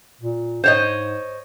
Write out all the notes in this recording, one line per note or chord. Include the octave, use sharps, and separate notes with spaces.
A#2
G#2 C5 C#5 D#5